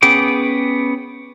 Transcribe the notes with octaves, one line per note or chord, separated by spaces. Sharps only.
B3 C#4 G#4 G5 D6